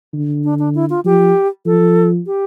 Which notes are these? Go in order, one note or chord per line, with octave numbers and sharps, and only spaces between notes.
D3
D4
D4
E4
F4
F3 G4
F3 A4
G4